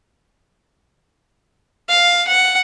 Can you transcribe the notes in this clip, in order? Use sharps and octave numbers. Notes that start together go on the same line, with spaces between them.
F5
F#5